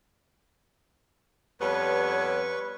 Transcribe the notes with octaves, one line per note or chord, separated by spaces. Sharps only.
F2 G3 B3 B4 C#5 C#6